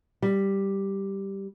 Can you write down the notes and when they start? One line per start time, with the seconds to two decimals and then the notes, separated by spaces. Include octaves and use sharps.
0.22 G3